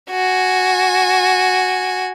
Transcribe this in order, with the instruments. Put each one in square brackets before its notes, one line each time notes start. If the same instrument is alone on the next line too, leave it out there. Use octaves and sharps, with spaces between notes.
[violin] F#4 G#5